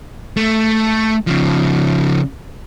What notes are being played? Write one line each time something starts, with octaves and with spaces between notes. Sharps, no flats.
A3
C#3 F3